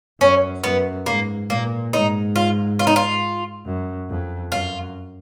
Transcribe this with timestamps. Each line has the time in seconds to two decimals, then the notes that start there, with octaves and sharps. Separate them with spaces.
0.20 F#2 C#4
0.64 F#2 B3
1.06 G#2 A#3
1.49 A#2 A#3
1.93 G#2 D#4
2.36 F4
2.79 F4
2.87 D#4
2.96 F4
3.65 F#2
4.09 F2
4.52 F#2 F4